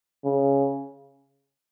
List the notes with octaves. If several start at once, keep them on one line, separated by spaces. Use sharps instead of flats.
C#3